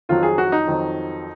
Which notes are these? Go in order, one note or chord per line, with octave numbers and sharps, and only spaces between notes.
F2 D#3 F#3 F4
G#4
F#4
D#4
F2 D#3 F#3